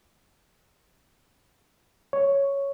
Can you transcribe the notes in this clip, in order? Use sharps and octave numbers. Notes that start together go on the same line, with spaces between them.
C#5